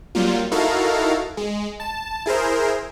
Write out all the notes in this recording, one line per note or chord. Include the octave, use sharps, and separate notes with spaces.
F#3 G3 A#3 F4
D#4 E4 F#4 A4 A#4 F5
G#3
A5
E4 G#4 A#4 C5